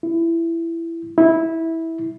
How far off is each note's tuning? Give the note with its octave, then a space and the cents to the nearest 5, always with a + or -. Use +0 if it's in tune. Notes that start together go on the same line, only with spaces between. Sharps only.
E4 +15
E4 -15